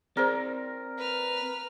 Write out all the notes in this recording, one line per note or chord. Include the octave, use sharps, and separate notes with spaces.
C4 G#4 A#4 C5 D5
B4 F6